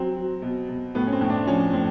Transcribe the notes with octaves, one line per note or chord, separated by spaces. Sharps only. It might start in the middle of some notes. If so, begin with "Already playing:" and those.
Already playing: F#3 C4
F#3
B2
B2
A2 B3
C#4
C4
A2
D4
F3 C#4
A2 C4